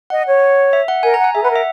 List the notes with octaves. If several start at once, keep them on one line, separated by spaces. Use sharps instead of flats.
D#5 F#5
C#5
E5
F#5
A#4 G#5
A#5
F#5
G#5
G#4 E5
B4 F#5
A#4
E5